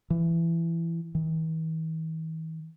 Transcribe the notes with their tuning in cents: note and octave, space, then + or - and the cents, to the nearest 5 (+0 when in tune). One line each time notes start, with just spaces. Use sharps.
E3 +20
E3 -45